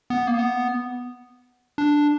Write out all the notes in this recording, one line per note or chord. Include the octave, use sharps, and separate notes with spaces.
B3
A#3
B3
D4